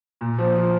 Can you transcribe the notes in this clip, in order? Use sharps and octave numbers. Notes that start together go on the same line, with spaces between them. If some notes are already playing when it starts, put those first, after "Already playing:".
A#2
F3
F3